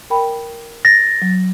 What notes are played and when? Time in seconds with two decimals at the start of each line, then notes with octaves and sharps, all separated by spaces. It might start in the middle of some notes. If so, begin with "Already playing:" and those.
0.10 A#4 G5 B5
0.85 A6 A#6
1.22 F#3